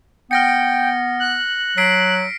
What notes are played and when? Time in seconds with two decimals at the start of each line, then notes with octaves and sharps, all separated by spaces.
0.31 B3 G5 F6 A#6 C#7
1.20 F#6
1.77 F#3 B6 C7 D7